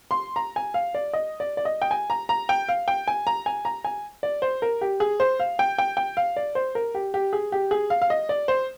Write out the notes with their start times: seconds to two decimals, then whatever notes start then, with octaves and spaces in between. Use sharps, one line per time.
0.11 C6
0.36 A#5
0.56 G#5
0.74 F5
0.95 D5
1.13 D#5
1.40 D5
1.57 D5
1.65 D#5
1.82 G5
1.91 G#5
2.10 A#5
2.29 A#5
2.49 G5
2.69 F5
2.88 G5
3.08 G#5
3.27 A#5
3.46 G#5
3.65 A#5
3.84 G#5
4.23 D5
4.42 C5
4.62 A#4
4.81 G4
5.00 G#4
5.20 C5
5.40 F5
5.59 G5
5.78 G5
5.97 G5
6.17 F5
6.37 D5
6.55 C5
6.75 A#4
6.95 G4
7.14 G4
7.33 G#4
7.52 G4
7.71 G#4
7.90 F5
8.02 F5
8.10 D#5
8.29 D5
8.48 C5